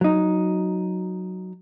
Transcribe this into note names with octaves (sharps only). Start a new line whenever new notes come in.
F#3 D#4